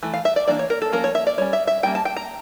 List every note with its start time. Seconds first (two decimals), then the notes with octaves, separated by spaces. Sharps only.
0.03 E3 A3
0.14 F5
0.25 E5
0.36 D5
0.47 E3 A#3 D4 D5
0.59 C#5
0.70 A#4
0.82 A4
0.92 F3 A#3 C#4 A#4
1.04 C#5
1.15 E5
1.27 D5
1.38 G3 C#4 C#5
1.53 E5
1.67 E5
1.83 G3 A#3 C#4 G5
1.95 A5
2.05 G5
2.17 A#5